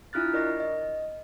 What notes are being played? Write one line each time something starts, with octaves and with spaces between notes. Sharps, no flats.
D4 E4 F4 F6 F#6 A6
A#4 D5 D#5 C#6 A#6
D#5